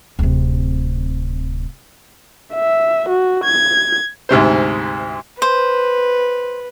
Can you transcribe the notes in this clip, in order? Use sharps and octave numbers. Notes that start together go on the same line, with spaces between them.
D1 C3
E5
F#4
G#6
D2 G#2 C3 C5
B4 C5